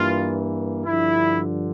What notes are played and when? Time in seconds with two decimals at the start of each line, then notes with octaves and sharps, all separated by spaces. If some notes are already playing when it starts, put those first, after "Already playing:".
Already playing: G2 E3 A#3 F4
0.85 G2 D3 F3 E4